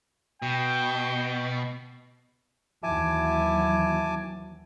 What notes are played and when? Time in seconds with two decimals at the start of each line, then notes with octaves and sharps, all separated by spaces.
0.42 B2 G5
2.83 D#2 E3 F#3 E4 G#5 A5 D6